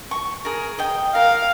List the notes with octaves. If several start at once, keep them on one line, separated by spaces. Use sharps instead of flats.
C#6
G#4 A#4
D#5 G5
A#4 F5